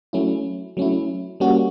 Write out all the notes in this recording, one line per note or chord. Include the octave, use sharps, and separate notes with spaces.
F#3 A3 C#4 E4
F#3 A3 C#4 E4
G3 A#3 C#4 F#4